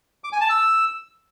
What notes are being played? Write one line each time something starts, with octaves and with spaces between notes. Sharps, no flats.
D6
G#5
A5
E6